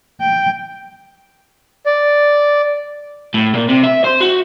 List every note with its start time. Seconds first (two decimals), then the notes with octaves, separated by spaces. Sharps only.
0.21 G5
1.86 D5
3.34 A2
3.54 A#2
3.68 C3
3.83 E5
4.04 C5
4.21 F#4